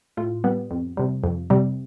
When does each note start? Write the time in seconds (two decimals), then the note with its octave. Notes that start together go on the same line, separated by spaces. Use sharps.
0.17 A2 F4
0.44 G3 B3
0.71 F2
0.97 C3 G3
1.24 F2
1.50 C3 G3